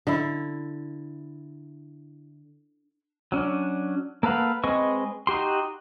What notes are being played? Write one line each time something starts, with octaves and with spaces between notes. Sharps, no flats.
D3 E4
F#3 C#4 D4
A#3 A4 B4 F5 F#5
G#3 C4 B4 D#5 C#6
D#4 F#4 G4 C6